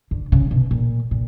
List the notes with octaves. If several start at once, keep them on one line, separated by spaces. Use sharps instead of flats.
D3
C#3
B2
A#2
A#2